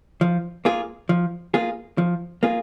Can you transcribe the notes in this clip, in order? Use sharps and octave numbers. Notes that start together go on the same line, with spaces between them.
F3
A#3 F4 G#4
F3
A#3 F4 G#4
F3
A#3 F4 G#4